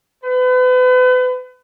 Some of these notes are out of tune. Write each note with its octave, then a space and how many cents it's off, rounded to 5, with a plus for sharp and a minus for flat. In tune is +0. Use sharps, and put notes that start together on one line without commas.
B4 +35